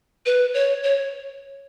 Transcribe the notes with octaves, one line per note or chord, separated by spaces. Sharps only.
B4
C#5
C#5